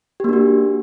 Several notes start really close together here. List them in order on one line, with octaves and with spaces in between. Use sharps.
G4 A#3 D4 F#4